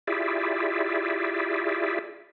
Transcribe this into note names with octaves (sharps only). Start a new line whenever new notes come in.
E4 F4 G4 G#4 D5 E5